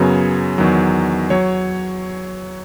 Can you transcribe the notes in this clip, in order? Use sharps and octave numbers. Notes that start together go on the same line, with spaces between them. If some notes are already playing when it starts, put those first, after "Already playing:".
Already playing: F#2 C#3 F#3 B3 C#5
E2 D#3 F#3
F#3 C#5